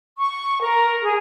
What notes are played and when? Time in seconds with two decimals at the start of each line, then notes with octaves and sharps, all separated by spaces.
0.18 C#6
0.60 A#4
1.02 G#4